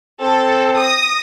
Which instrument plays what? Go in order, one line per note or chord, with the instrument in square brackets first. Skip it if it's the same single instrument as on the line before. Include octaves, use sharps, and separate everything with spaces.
[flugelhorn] C4 [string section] A4
[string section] D#6 A#6